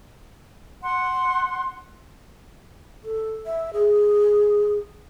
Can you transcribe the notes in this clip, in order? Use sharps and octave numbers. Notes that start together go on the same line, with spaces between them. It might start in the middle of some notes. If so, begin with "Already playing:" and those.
F#5 C6
A4
E5
G#4